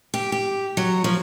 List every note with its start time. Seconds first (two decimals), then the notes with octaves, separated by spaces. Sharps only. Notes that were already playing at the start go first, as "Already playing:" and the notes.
0.14 G4
0.32 G4
0.77 F#3
1.04 F3